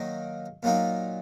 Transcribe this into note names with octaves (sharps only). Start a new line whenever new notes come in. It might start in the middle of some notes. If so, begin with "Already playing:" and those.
Already playing: D#3 F#3 A#3 D#4 F#4
A#2 F#3 A#3 D#4